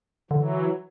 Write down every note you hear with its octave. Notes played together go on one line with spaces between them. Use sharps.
D3 E3 F#3